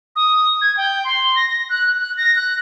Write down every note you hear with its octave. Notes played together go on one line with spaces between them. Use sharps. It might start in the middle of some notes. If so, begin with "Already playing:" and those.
D#6
G#6
G5
C6
A#6
A#6
F#6
F#6
A#6
F#6